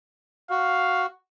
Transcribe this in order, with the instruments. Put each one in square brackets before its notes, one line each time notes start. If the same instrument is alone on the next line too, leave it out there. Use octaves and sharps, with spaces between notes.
[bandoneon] F#4 [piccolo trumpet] F5